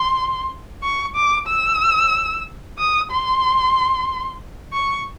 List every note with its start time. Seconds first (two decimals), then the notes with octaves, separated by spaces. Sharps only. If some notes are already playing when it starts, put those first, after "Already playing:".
Already playing: C6
0.83 C#6
1.15 D6
1.47 E6
2.78 D#6
3.11 C6
4.73 C#6